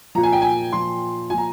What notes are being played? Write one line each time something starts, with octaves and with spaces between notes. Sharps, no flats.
A#2 F3 A#5
G#5
G5
G#5
A#2 F3 C6
A#2 F3 G#5 A#5